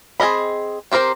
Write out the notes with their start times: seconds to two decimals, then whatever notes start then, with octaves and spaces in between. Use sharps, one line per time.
0.20 C4 G#4 A#4 D#5 B5
0.92 C4 G4 A#4 C5